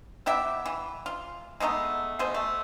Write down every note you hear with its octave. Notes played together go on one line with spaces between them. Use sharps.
B3 E4 G4 E5
E3
F4
G#3 A3 B3 D#4
B2 A3 G#4 C5
A3